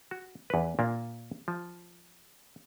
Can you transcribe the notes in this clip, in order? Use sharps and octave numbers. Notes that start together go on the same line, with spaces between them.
F#4
E2 B4
A#2 A#3 D4
F3